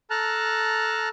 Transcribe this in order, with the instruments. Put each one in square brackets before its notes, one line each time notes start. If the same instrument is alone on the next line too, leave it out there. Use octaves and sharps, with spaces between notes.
[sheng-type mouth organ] A4 A5 A#5 F6 F#6